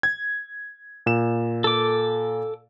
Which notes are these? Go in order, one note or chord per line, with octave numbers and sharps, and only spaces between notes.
G#6
A#2 E7
A4 D6